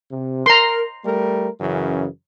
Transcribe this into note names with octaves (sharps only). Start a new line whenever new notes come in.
C3
A#4 A#5 C6
G3 A3 A#4
F#2 C#3 E3